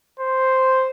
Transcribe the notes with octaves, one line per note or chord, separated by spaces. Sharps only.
C5